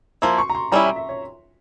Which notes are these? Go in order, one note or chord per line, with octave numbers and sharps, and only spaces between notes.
F3 A#3 E4 C6
C#6
A#5
C6
G3 C#4 E4 A#5
E5
E5
C#5